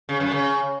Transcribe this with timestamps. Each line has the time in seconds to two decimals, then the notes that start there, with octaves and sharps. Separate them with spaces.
0.09 C#3
0.20 F#2
0.32 C#3